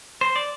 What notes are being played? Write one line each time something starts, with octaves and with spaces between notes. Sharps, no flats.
C5
D5